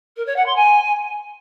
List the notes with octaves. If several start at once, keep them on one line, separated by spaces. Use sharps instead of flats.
A#4
C#5
F#5
C6
G#5